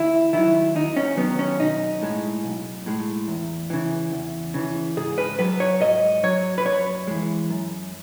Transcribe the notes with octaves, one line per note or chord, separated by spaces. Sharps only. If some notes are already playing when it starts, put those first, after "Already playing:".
Already playing: D#2 E4
D#3 F#3 E4
D#2 D#4
C#4
D#3 F#3 B3
C#4
B1 D#4
A2 G#3
B1
A2 G#3
E2
C#3 E3
E2
C#3 E3
G#2 G#4
B4
F#3 B4
C#5
G#2 D#5
F#3 C#5
B4
F#2 C#5
E3 G#3
F#2